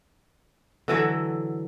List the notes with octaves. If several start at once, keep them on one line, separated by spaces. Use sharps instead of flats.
D3 E3 F#3 A4